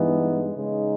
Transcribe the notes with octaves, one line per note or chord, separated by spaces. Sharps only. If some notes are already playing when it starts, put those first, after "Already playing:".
Already playing: G2 E3 G#3 B3 D#4
C#3 G#3 D#4